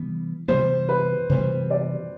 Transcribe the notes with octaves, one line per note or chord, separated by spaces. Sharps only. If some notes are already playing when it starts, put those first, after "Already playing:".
Already playing: C3 E3 G3 B3
C3 E3 G3 B3 C5
B4
C3 E3 G3 B3 C5
D5